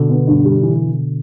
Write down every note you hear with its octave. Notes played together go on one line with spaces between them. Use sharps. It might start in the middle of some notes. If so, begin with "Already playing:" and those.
Already playing: B2 D3
B3
G2
G3
E3